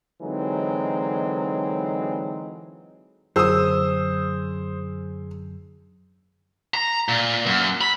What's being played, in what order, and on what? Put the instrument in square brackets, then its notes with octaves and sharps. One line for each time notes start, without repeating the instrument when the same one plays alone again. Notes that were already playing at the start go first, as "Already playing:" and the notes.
[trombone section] D3 E3 F#3 G#3 C4 D#4
[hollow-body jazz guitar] F#2 D3 F#3 [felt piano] G#4 E6 [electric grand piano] C5 D#6
[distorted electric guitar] A#5
A#2
F#2
B5